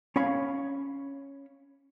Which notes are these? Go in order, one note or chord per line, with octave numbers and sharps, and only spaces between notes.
C#4 C#5 F5 B5